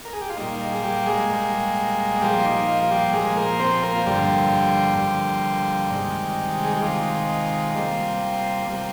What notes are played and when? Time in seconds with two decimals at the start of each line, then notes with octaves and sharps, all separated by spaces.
0.05 A#4
0.13 G#4
0.21 G4
0.30 F4
0.37 A#2 G3 A#3 D#4
0.72 G#4
0.84 G3 G4
1.06 G#3 G#4
1.30 A#2 G3 A#3
2.21 A#2 F3 G3 A#3 G4
2.40 F4
2.44 D#4
2.68 F4
2.83 F4
2.91 G3 G4
3.13 A#2 F3 G#3 A#3 G#4
3.36 A#3 A#4
3.59 C4 C5
3.83 A#3 A#4
3.95 F4
4.06 G2 D3 F3 G3 A#3 G4
4.98 G2 D3 F3 A#3
5.90 C3 D#3 G#3
6.64 G#4
6.73 G4
6.82 C3 D#3 G#3 F4
7.74 C3 G3 A#3
8.67 C3 G3 A#3